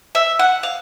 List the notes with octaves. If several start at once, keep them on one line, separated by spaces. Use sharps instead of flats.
E5
F#5
F5